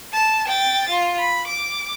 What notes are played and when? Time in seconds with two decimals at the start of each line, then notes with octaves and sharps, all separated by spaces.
0.13 A5
0.48 G5 A6
0.89 F4
1.19 B5
1.47 D6